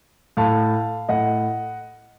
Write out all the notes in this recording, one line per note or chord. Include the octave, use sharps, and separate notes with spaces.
A2 F5 A5
A2 D#5 F#5